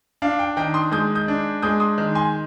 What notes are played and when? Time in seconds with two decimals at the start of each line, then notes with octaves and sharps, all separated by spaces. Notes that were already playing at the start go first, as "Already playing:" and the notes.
0.22 D4 F5
0.39 G5
0.57 D#3 G5
0.74 C6 D#6
0.92 G#3 D#6 G6
1.15 D#6 G6
1.28 D4
1.62 G#3 D#6 G6
1.80 C6 D#6
1.98 D#3
2.15 G#5 C6